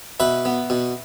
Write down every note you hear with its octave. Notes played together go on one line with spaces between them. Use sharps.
B2 B4 E5
B3
B2